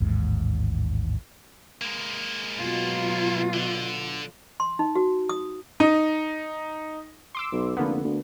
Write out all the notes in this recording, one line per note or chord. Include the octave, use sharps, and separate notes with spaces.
A1 D#2 G#2
G#3 A#3
B2 F#3 F4
D3
C6
D#4
F#4
D#6
D#4
C6 D6 E6
B1
F1 D3 A#3 B3
D2